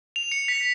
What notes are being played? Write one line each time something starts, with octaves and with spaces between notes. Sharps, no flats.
F7
C#7
B6